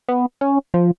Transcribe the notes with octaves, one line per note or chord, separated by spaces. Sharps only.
B3
C#4
F3